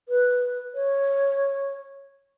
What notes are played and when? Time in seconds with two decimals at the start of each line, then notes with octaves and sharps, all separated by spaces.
0.09 B4
0.74 C#5